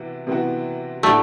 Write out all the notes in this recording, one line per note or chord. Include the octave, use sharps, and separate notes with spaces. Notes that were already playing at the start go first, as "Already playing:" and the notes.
Already playing: C3 E3 B3 F#4
C3 E3 B3 F#4
A2 G3 A3 D4 F#4